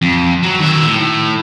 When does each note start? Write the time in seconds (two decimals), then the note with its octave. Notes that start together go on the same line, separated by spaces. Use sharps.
0.02 F2
0.43 F#3
0.60 D#3 E5
0.86 A2